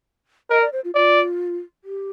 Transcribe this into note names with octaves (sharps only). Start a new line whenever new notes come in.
A#4 D#5
D5
C5
F4
F4 D5
G4